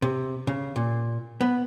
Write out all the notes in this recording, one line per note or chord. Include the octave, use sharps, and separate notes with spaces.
C3
C#3
A#2
B3